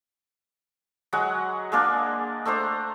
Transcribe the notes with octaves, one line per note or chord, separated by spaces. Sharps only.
F#3 G#3 F#5
G#3 A#3 D4
A3 D4 C5 A#5